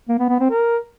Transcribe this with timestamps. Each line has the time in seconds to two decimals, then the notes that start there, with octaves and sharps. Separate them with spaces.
0.08 A#3
0.19 B3
0.29 B3
0.40 C4
0.50 A#4